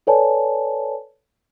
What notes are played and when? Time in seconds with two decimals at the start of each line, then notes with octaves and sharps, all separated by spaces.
0.07 A4 B4 C#5 D5 G#5 A5